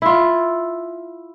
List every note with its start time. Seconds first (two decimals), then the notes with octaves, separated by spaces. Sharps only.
0.02 E4 F4